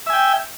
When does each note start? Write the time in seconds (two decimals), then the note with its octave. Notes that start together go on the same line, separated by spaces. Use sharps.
0.06 E5
0.10 G#5
0.13 G5